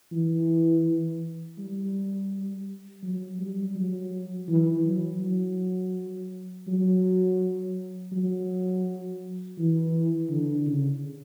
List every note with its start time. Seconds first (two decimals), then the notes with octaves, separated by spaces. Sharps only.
0.12 E3
1.59 G3
3.03 F#3
3.40 G3
3.76 F#3
4.49 E3
4.85 F#3
5.21 F#3
6.68 F#3
8.12 F#3
9.58 E3
10.30 D3
10.67 C#3